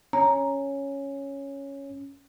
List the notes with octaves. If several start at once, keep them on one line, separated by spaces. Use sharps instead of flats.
C#4 A#5